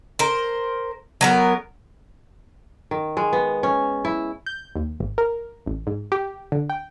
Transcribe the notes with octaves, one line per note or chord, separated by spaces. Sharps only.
A#4 C5
F#3 B3 A#4
D#3
G#3
B3
C#4
E4
G6
D#2
G#1
A#4
A1
G#2
G4
D3
G5